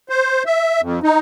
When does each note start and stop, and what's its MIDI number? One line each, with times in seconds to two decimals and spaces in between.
0.09 0.43 72
0.46 0.81 76
0.81 0.99 41
1.03 1.20 63